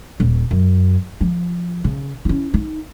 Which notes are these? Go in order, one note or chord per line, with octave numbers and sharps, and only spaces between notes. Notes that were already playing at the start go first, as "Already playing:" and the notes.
D#1
F#2
F3
C#3
C#4 E4
D#4